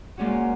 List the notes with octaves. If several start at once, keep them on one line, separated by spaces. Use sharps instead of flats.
A#2 G#3 C#4 F#4